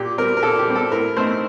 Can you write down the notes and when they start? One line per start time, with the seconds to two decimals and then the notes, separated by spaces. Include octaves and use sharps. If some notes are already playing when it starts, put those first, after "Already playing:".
Already playing: A#2 G4
0.18 G3 C4 A#4
0.37 A#4
0.43 A#2 A4
0.59 G4
0.67 G3 C4
0.76 A4
0.92 A2 A#4
1.16 A3 C4 D#4 C5